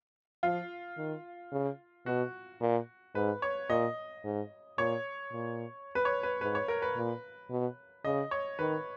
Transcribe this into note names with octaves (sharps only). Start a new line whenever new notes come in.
F3 F4
D#3
C#3
B2 F#4
A#2
G#2 B4
C#5
A#2 D#5
G#2
A#2 C#5
A#2
B4
C#5
B4
G#2 B4
C#5
A#4
B4
A#2
B2
C#3 D#5
C#5
D#3 B4